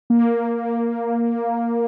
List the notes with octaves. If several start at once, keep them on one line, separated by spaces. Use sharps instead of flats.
A#3